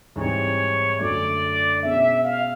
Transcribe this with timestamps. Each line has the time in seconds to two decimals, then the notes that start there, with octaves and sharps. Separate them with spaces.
0.16 G#2 E3 G3 C4 D#4 C#5
1.00 F#2 D3 F#3 A3 D5
1.83 B2 G#3 C#4 E5
2.24 F5